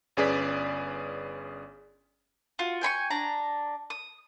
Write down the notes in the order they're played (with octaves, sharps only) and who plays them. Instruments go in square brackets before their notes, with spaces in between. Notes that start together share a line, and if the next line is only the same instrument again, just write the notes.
[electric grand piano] G1 C#4 G#4 B4 D5 B6
[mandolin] F4 F#4
G5 G#5 B5 C#6
D4 A#5
D#6